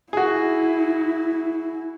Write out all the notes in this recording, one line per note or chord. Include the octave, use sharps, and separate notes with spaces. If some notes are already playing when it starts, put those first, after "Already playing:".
E4 F#4 G#4